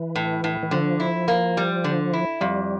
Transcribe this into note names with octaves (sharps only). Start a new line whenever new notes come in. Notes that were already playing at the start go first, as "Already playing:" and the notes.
Already playing: E3
A2
A2
E3
D3 F3
E4
A#3
G3
D3
E4
F2 G3